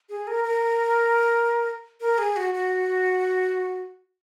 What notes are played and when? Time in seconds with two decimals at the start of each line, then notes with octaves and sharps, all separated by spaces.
0.09 G#4
0.27 A#4
0.45 A#4
2.01 A#4
2.18 G#4
2.36 F#4
2.54 F#4